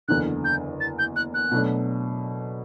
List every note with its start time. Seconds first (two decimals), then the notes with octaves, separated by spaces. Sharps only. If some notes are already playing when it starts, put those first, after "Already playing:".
0.08 F#1 E2 D3 F#6
0.44 G6
0.80 A6
0.99 G6
1.16 F#6
1.34 F#6
1.51 B2 F#3 A3 D4